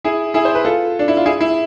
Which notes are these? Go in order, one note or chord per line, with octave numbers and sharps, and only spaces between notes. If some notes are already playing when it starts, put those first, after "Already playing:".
E4 G#4
E4 G#4
C5
B4
F4 A4
D4
E4
F4
E4 G#4
E4